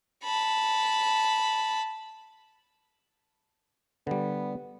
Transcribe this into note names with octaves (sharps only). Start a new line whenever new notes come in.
A5 B5
D3 G3 B3